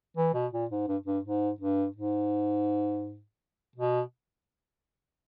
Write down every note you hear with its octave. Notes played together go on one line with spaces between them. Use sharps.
E3
B2
A#2
G#2
G2
G2
G#2
G2
G#2
B2